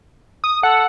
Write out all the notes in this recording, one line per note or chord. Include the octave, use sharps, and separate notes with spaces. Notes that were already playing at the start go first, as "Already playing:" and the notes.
D#6
A4 F#5